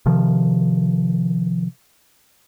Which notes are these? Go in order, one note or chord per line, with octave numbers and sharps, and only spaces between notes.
C3 D#3 F3